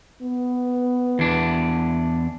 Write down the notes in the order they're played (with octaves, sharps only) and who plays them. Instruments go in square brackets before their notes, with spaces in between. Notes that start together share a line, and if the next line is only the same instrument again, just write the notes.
[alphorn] B3
[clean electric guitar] E2 D4